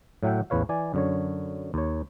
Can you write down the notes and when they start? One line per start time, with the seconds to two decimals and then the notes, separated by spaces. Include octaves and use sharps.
0.23 A2 F#3 E5 F#5 G5
0.50 A1 E2 B4 C#5 F5
0.69 E3 D5 G#5
0.94 F#2 D3 C#5
1.74 D#2 C#5